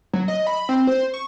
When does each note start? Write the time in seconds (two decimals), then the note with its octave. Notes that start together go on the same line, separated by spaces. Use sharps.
0.13 F#3
0.28 D#5
0.47 B5
0.69 C4
0.87 C5
1.14 C#6